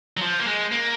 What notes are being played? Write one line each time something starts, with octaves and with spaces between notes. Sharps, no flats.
F#3
F3
A#3
G#3
A#3